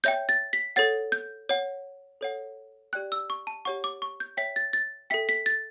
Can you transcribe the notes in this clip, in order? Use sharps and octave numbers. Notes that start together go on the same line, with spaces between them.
C#5 E5 G5 G6
A6
B6
A4 C#5 F#5 A6
G6
C#5 F#5
A4 C#5 F#5
G4 D5 G5 F#6
E6
C#6
A5
G4 C#5 F#5 C#6
D6
C#6
G6
C#5 E5 G5 B6
A6
A6
A4 E5 G5 B6
B6
A6